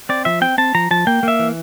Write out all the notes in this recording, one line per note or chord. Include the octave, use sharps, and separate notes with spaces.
C4 D5
F3 E5
C4 G5
C4 A5
F3 A#5
F3 A5
A#3 G5
A#3 E5
E3